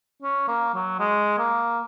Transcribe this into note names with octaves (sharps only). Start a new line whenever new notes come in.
C#4
A#3
F#3
G#3
A#3